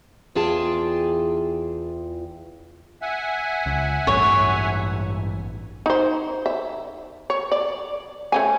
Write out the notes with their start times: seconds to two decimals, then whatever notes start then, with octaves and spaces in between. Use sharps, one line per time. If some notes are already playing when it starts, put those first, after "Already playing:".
0.35 E2 E3 F4 G#4 G5 A5
3.02 E5 F#5 G#5
3.66 C#2
4.07 A1 G2 C#5
5.86 D#4 C5
6.46 E5
7.30 C#5
7.52 D5
8.32 A3 C#4 G#5